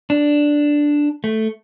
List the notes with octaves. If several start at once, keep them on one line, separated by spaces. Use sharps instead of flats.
D4
A3